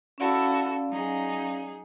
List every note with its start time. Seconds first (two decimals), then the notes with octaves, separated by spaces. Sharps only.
0.18 C#4 E4 F#4 A4 D5 F5
0.89 F#3 D#4 G#4